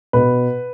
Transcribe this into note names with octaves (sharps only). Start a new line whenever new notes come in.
B2 B4